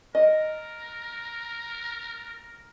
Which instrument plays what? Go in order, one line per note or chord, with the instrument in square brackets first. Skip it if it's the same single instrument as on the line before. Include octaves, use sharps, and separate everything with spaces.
[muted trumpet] A#4 [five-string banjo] D#5